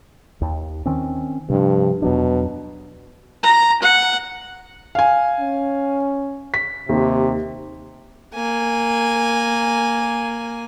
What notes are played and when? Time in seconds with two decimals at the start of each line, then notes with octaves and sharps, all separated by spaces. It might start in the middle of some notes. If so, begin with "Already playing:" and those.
0.41 D#2
0.86 D#3 C4 C#4
1.50 G2 C3 F3
2.02 E2 B2 F#3 D4
3.43 A#5
3.82 F#5
4.95 F5 G#5
5.40 C#4
6.54 B6
6.89 D#2 C3
8.34 A#3 G#5